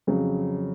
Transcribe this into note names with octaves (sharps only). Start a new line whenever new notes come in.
F2 C#3 F#3